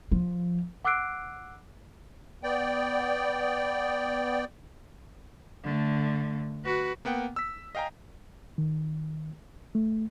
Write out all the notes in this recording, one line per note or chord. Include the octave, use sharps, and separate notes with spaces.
F3
F#5 D6 E6 F#6 C7 D7
B3 D5 G5
D3 A3
F#4 B4
A#3 B3 F#5 G5
E6 B6
D#5 F5 G5 G#5 A#5
D#3
A3